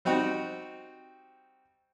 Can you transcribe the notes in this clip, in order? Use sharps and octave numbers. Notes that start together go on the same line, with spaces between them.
G3 C4 D#4 F#4